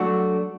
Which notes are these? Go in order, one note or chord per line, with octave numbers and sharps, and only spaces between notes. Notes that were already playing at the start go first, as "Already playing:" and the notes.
Already playing: F#3 A3 D4 F#4